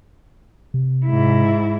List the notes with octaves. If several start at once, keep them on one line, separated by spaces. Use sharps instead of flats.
C3
G#2 E4